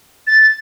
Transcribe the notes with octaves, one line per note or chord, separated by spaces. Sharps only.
A6